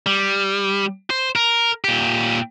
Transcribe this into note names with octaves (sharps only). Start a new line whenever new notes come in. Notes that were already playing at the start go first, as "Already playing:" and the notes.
G3
C5
A#4
A#2 G4